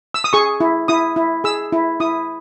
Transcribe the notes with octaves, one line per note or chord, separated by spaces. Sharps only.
E6
D#6
G#4 C#6
E4
E4 D#6
E4
G#4 E6
E4
E4 D#6